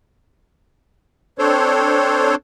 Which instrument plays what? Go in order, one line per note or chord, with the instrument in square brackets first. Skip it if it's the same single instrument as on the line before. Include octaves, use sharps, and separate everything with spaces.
[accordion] C4 D4 A4 C5 C#5